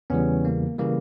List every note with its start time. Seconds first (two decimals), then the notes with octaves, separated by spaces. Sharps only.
0.10 E2 C#3 E3 G3 B3 C#4
0.45 A#3
0.79 C#3 E3 G3 A#3